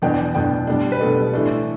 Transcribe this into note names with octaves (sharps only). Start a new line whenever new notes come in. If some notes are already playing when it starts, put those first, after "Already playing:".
E2 B2 B3 D4 G5
E2 B2 B3 D4 G5
B2 G3 D4
B4
B2 G3 D4 A4
A2 E3 A3 D4